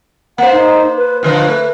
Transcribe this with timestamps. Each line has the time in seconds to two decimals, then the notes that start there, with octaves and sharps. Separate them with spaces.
0.38 A#3 C5 F#5
0.53 D#4
0.97 B4
1.23 A#2 D3 F3 B4
1.48 A3